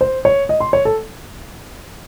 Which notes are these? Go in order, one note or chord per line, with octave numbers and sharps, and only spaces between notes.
C5
C#5
D#5
C6
C#5
A4